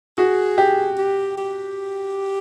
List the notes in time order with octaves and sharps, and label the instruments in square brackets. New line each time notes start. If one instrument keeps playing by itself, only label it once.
[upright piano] F#4 [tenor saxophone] G#4
[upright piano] G4
[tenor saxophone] G4
G4